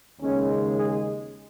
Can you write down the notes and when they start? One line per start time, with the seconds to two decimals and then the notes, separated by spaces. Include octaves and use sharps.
0.20 D#2 C#3 G#3 C#4
0.78 G#4